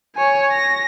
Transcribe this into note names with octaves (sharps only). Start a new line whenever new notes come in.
C#5 G#5
A#6